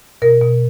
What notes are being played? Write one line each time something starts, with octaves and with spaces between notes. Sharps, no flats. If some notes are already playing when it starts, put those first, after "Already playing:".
B2 A#4
B2